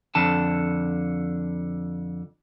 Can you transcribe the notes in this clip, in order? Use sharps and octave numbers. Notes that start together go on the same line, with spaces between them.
F2 D3 A5